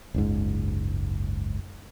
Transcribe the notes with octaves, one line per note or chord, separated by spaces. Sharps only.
F#1 C#2 G#2